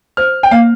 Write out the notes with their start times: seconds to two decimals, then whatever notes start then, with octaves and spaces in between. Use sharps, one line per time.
0.17 C5 F6
0.43 G5
0.51 A#3 F5